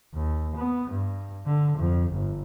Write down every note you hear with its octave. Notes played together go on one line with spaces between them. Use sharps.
D#2
B3
G2
D3
F2
G1